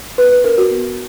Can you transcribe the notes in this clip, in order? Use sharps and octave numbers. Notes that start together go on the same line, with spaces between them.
B3 B4
B4
D4 A#4
F#4
B3